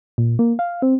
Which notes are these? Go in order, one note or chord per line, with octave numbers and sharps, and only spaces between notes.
A#2
A#3
F5
C4